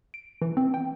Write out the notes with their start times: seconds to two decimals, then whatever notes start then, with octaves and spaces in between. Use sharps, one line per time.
0.14 D7
0.42 E3
0.57 C4
0.74 G5